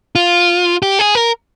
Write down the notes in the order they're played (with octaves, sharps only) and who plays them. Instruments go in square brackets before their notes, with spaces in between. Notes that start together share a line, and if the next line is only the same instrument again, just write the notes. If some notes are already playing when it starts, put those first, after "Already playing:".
[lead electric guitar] F4
G4
G#4
A#4